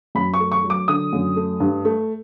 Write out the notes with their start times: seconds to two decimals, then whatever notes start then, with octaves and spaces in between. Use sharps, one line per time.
0.15 F#2 B5
0.34 C#6
0.40 A3
0.52 C#6
0.64 F#3
0.70 D6
0.88 D3 D#6
1.13 F#2
1.36 A3
1.60 G2
1.85 A3